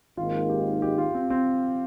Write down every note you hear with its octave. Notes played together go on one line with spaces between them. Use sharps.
G#1 G#2 D#3 A#3 D#4 F4
G4
G4
F4
C4
C4